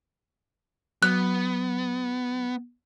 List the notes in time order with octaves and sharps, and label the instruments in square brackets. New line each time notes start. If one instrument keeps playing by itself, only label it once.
[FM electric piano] F#3 [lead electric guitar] B3 [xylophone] F#6